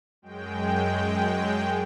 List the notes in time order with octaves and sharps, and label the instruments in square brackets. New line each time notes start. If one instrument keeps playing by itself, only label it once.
[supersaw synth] F#2 G#3 G5